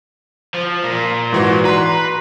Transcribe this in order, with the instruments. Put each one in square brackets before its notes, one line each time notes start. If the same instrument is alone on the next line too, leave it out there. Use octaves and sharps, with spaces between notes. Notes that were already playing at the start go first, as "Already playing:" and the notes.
[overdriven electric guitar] F3
A#2
[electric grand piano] G#2 E3 F#4
[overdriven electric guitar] B4 [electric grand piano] A#5 C6